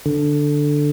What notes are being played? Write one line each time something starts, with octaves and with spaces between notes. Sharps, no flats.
D3